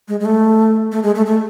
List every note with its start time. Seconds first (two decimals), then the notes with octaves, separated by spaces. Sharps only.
0.08 G#3
0.20 G#3
0.25 A3
0.92 A3
1.03 G#3
1.15 A3
1.26 A3